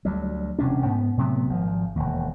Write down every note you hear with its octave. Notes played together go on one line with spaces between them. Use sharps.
D2 F#3 G3
E1 C3 C#4 D4
G#2 B3
A2 C3 F#3 B3
G#1 F3
E1 D#2